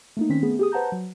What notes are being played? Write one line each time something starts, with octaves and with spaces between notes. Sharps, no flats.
A3 A#3 D#4
D#3 C4 C#4 B6
A3 B3 G#4
G4 G#4 D#6
B4 C5 F#5 A5 A#5 G6
F#3